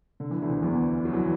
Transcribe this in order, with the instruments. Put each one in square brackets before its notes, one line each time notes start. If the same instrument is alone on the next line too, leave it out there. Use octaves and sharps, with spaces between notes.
[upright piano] D3
E3
D2 D3
E2 E3
F#3
E3